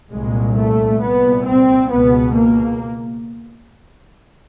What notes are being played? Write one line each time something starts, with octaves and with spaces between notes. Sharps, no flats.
C2 A#2 G#3
A3
C2 A#2 B3
C4
C#2 B2 B3
A#3